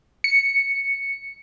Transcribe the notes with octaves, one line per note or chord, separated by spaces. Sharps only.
C#7